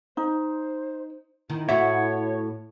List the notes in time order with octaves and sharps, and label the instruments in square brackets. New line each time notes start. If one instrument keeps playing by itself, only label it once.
[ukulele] D#4 [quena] C5
[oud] D#3 [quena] E4
[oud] A2 F#4 [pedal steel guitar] C#5 [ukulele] E5